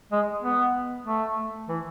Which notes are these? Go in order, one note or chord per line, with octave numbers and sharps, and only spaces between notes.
G#3
B3
A3
E3